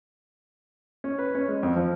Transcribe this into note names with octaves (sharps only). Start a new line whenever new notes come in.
C#4
B4
C#4
G#3
F2
F3